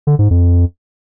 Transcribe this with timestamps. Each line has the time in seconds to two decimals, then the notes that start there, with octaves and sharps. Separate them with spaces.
0.07 D3
0.19 G#2
0.31 F2